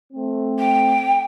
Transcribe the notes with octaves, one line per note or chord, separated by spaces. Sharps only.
A3 C4
G5